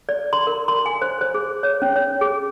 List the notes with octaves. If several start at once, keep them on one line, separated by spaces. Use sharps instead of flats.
D5
C6
A#4
C6
G#5
C5
C5
G#4
C#5
C#4
C#5
G#4